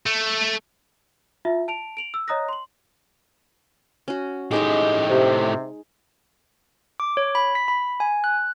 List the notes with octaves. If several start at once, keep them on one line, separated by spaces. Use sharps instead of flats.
A3
E4 F4 E5
A5 D7 F7
D7 F7 F#7
E6
C#5 D#5 A#5 D#6 F#6 A#6
C6 F#7
C#4 F#4
A2 G#3 D#4 G4 E5
C3
D6
C#5
B5
B6
B5
G#5
F#6